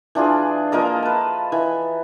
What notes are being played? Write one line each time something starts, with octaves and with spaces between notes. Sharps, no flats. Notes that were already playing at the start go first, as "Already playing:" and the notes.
E3 D4 F4 G#4
F3 A#3 A#4 D#5
B4 A5
E3